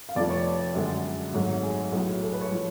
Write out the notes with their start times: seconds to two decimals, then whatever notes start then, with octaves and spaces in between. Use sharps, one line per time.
0.09 F5
0.15 F1 F2 F3 A3 D5
0.30 C#5
0.75 F#2 D3 G#3
1.33 G#1 G#2 F#3 A3
1.63 G#4
1.92 B1 A2 F#3 A3
2.21 A4
2.32 B4
2.41 C#5
2.52 F3